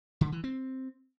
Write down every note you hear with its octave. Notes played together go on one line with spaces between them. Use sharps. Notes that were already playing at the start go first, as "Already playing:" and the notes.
D3
E3
C4